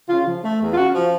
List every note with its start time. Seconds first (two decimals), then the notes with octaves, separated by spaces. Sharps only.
0.08 C#3 F4
0.25 F3
0.43 A3
0.59 E2
0.72 F4
0.77 C#3 F#4
0.94 F3